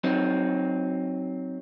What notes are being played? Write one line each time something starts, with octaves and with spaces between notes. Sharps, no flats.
F#3 C4 D#4